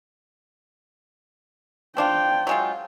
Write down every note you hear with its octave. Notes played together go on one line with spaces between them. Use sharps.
C4 D4 F4 G5
F#3 G#3 F4